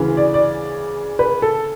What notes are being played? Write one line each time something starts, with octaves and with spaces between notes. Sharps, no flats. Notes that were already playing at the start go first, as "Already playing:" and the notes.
Already playing: D2 C#3 E3
D5
D5
B4
A4